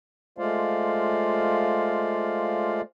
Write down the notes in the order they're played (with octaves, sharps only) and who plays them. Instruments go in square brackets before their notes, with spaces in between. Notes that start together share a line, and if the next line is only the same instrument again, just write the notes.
[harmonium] G#3 A3 F4 C5 D5 F5